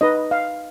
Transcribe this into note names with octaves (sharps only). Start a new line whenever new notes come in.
D#4 B4 D#5
F5